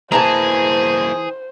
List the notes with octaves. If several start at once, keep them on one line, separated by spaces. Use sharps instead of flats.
E3 A#3 E4 G#4 C5 A5 A#5